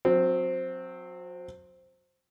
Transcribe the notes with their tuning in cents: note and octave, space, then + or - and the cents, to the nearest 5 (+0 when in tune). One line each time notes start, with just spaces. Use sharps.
F#3 -30 C4 +0